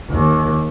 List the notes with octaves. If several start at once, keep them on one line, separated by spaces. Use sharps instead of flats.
D#2